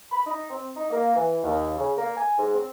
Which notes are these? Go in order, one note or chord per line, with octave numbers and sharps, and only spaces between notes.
B5
D#4
C4
D#4
A#3
E3
D#2
C#3
A#3
G#5
G#2
C4